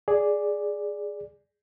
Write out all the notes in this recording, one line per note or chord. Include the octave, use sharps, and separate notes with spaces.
G#4 D5